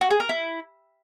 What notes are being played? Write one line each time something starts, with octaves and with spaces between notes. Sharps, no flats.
F#4
G#4
A#4
E4